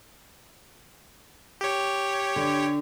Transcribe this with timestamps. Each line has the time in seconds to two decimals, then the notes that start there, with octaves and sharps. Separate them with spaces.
1.61 G4 C#5
2.36 D3